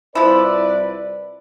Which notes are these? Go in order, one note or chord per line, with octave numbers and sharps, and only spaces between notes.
C2 F3 E4 B4 D5